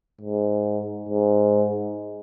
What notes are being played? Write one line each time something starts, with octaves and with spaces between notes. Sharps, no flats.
G#2
G#2